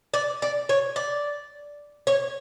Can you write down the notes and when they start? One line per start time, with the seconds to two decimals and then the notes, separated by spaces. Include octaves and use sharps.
0.14 D5
0.42 D5
0.69 C#5
0.96 D5
2.07 C#5